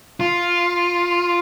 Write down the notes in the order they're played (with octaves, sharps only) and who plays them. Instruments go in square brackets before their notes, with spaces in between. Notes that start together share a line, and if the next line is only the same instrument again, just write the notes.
[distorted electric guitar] F4